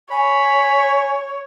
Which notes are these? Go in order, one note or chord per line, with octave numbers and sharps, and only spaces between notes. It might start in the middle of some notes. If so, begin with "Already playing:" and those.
C#5 G#5 B5